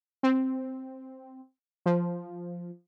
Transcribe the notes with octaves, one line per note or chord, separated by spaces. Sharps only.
C4
F3